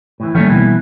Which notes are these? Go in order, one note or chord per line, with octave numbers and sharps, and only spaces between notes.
A2 E3
D#3 F3 G3 A3 A#3 C#4
B2 E3